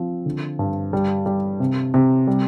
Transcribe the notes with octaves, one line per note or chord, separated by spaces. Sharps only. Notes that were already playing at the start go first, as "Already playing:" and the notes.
Already playing: F3 C4
D3
G2
G3
G3
C3
C3
G3